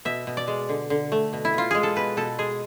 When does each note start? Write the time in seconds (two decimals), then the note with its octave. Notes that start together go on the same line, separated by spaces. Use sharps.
0.05 B2 E5
0.27 B2
0.37 D5
0.48 G#3
0.69 D3
0.90 D3
1.12 A3
1.33 B2
1.45 E4
1.54 B2 F4
1.71 G#3 G#4
1.83 A4
1.96 B2 B4
2.17 B2 A4
2.39 G#3 G#4